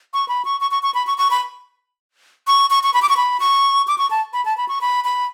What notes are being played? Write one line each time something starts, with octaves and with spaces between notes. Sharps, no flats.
C#6
B5
C#6
C#6
C#6
C#6
B5
C#6
C#6
B5
C#6
C#6
C#6
B5
D6
C#6
B5
C#6
D6
C#6
A5
B5
A5
B5
C#6
B5
B5